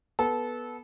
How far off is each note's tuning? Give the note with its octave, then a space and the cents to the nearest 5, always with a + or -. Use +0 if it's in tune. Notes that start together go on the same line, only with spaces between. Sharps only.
B3 -15 A4 -20